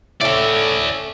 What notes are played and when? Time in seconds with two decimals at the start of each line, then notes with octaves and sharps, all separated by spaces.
0.21 A2 A3 C#4 D5 E5